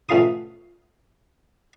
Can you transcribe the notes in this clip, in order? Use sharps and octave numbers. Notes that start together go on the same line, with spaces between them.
B2 A3 C#4 F4 C6 D#6